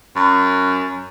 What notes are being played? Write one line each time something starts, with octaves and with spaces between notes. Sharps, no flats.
F#2